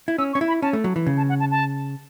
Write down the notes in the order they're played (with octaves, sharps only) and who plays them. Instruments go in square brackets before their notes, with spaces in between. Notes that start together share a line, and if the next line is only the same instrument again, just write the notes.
[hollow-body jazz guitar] E4
[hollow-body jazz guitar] C#4 [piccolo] E6
[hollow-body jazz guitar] C#4 [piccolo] C#6
[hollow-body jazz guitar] E4
[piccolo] B5
[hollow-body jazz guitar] C#4 [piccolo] A5
[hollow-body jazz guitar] A3
F#3
E3
C#3
[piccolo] A5
F#5
A5
A5